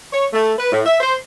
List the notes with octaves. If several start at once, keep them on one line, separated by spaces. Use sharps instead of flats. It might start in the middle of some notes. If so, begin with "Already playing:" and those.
C#5
A3
B4
A2
E5
C5